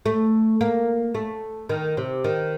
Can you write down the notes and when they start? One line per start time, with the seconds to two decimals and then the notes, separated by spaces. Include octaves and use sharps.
0.06 A3
0.61 A#3
1.15 A3
1.69 D#3
1.97 C3
2.24 D#3